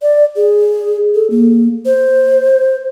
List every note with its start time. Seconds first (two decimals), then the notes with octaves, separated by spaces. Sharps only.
0.02 D5
0.36 G#4
1.15 A4
1.30 A#3
1.86 C5